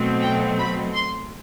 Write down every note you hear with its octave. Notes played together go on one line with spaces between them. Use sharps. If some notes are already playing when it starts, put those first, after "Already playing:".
Already playing: B2 F#3 A3 C4
G5
B5
C6